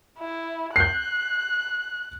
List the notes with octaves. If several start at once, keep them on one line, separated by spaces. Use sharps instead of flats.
E4
F#6 G6 C7